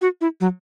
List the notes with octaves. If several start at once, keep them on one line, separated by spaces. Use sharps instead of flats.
F#4
E4
F#3